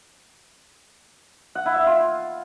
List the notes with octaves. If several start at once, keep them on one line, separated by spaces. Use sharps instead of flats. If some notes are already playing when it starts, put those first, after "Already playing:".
F#5
E4
E5
F4